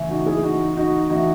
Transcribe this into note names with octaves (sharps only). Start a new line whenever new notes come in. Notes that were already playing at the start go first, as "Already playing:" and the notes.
Already playing: C#3 E3 A3 C#4
D#4 F#4
E4 G#4
D#4 F#4
D#4 F#4
E3 A3 C#4 D#4 F#4